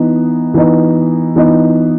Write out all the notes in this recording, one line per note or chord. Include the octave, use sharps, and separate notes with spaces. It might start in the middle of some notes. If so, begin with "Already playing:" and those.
Already playing: E3 B3 D#4
E3 B3 D#4
E3 B3 D#4